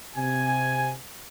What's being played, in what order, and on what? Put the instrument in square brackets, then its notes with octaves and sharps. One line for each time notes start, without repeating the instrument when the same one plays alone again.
[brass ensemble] C3 G#5